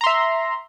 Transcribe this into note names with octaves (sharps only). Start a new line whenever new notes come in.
E5 A#5 C6